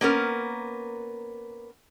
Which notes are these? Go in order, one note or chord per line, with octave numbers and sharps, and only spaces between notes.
A#3 B3 C#4 A#4